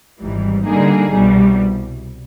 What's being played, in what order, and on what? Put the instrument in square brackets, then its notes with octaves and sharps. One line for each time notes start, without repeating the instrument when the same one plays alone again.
[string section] G#1 G#2 E3 G3
D3 G3 A#3 D#4 G#4
C2 B2 G3